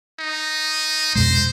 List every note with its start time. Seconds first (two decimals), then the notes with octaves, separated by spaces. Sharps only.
0.20 D#4
1.15 F2 B2 G#3 C5